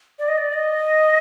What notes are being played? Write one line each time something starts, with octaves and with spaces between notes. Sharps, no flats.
D5
D#5
D5
D#5